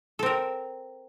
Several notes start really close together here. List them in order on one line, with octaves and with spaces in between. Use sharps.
A4 C4 A#4